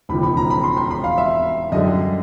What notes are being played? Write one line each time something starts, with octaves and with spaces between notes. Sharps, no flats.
E1 D#2 C#3 F3 B5
B5
A#5
B5
C6
C6
B5
F5
E5
F#2 D3 G3 D#5